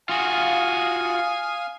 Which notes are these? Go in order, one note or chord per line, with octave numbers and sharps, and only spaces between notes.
F4 F#4 F5 G#5 D#6